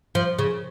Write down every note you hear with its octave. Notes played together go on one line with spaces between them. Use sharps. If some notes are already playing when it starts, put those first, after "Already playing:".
F3
C#3